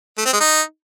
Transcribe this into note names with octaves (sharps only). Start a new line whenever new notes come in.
A3
C4
G#3
D#4